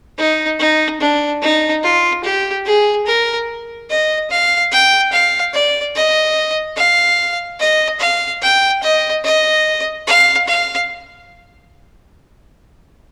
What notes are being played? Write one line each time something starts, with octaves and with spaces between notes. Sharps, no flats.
D#4
D#4
D4
D#4
F4
G4
G#4
A#4
D#5
F5
G5
F5
D5
D#5
F5
D#5
F5
G5
D#5
D#5
F5
F5